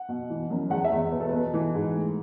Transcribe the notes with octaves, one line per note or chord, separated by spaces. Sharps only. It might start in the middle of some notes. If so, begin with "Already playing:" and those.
Already playing: F#5
B2
E3
F#2
E2 F#5
E5
E2
B2 B4
A4
B2 B4
E3
G#2
A3